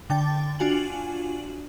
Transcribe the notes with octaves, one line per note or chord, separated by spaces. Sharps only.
D3 G5 A6
D4 F4 F#4 G#5 F#7